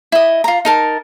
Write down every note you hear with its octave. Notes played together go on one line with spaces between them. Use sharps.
E4 D#5
F4 A#5
D#4 A#4 A5